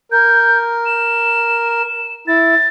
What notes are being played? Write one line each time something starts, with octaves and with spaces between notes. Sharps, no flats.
A#4 G6
E7
E4 A6